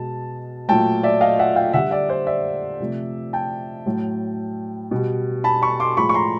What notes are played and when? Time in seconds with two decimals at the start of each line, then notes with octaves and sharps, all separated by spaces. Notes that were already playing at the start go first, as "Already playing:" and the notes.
Already playing: B2 G#3 A5
0.69 A#2 F#3 A3 G5 A5
1.03 D5 E5
1.21 D#5 F5
1.39 E5 F#5
1.56 F5 G5
1.74 D3 G3 E5 F#5
1.91 D5 E5
2.09 C5 D5
2.27 D5 E5
2.80 C3 F3 A3
3.33 G5 A5
3.86 A2 F#3 A3
4.91 B2 G3
5.44 A5 B5
5.62 B5 C#6
5.80 C6 D6
5.97 A2 F3 G#3 B5 C#6
6.09 C#6
6.14 A#5 C6